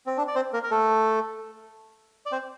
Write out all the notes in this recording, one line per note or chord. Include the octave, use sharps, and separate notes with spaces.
C4
D4
D5
C4 C5
A#3 A#4
A#4
A3 A4
D5
C4 C5